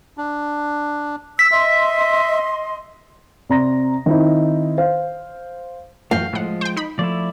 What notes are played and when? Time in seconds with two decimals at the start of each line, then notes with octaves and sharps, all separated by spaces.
0.18 D4
1.39 E6 B6
1.51 D#5 E5 C6
3.49 C3 D5 A#5 C6 A#6
4.06 D#3 C4 D#4 E4
4.78 C5 F5
6.11 F#2 E3 A3 F#4 F5 G5
6.33 A2 F3 G#3 F#5
6.61 C5 G5
6.76 D#4 B5
6.99 F3 A3 E4 D5